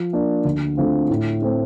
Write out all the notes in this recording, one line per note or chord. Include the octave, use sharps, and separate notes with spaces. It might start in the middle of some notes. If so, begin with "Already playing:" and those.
Already playing: F3
A#3 D4
D2
D3 A3 C4 F4
A2
A3 C4